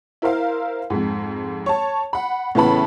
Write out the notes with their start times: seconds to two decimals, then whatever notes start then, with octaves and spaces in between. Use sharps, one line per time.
0.22 E4 A#4 C5 F5
0.90 F2 G#2
1.66 C#5 A5
2.13 F#5 B5
2.55 A2 C#3 E3 B3 A5 B5